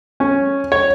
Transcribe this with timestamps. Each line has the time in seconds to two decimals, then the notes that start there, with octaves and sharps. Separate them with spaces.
0.20 C#4
0.72 C#5